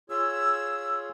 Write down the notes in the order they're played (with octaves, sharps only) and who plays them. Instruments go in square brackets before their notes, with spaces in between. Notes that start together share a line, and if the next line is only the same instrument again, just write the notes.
[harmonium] F4 G#4 C#5 [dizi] E6